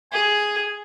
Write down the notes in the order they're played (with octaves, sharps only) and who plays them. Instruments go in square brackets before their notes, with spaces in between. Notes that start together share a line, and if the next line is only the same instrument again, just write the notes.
[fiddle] G#4 [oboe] G#5